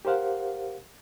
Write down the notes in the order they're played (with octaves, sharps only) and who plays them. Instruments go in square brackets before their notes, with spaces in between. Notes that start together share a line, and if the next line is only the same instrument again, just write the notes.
[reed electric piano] G4 A#4 C5 F5 F#5